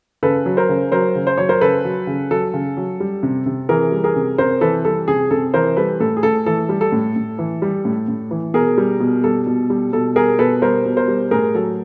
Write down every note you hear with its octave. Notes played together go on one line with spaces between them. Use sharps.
C#3 A4 B4
F#3
A#4 C5
C#3
F#3 A#4 C5
C#3
C5
F#3 C#5
A#4 C5
C#3 A4 B4
F#3
C#3
F#3 A4
C#3
F#3
G3
C3
C3
E3 G#4 A#4
G3
G#4 A#4
C3
C3 A#4 C5
E3 A4 B4
G3 A4
C3 G#4
C3 A4
E3 A#4 C5
G3 A4 B4
A2 A4
G#4
A2 A4
E3 A4
G3
A4
A2
A2
E3
G3
A2
A2
E3
B2 G#4 A#4
G3
B2
G3 A4
B2
G3
B2 A4
G3 G#4 A#4
B2 A4 B4
G3 A#4 C5
B2
A#4 C5
G3
A2 G#4 A#4
F#3 A4